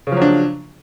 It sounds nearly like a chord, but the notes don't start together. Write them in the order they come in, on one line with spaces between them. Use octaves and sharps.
C#3 F3 F#3 D4